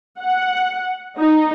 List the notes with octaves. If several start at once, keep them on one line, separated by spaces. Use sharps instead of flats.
F#5
D#4